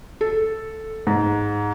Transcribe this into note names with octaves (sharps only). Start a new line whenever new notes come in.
A4
G#2